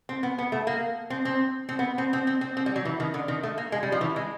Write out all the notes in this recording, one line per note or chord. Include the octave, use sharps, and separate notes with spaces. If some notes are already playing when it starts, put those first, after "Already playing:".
C4
B3
B3
A3
A#3
C4
C4
C4
B3
C4
C4
C4
C4
C4
G3
F#3
E3
D#3
D3
D#3
A3
A#3
G#3
G3
F3
E3
G#3